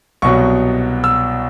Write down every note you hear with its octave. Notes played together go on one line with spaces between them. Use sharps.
C2 B2 F#3 C#6
E6